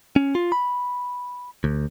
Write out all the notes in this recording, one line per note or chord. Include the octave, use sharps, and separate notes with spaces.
C#4
F4
B5
D2